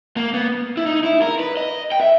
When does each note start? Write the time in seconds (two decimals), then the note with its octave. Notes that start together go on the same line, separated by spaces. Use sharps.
0.17 A#3
0.34 B3
0.77 E4
0.86 D#4
1.04 E4
1.22 A#4
1.39 B4
1.57 D#5
1.92 G5
2.01 E5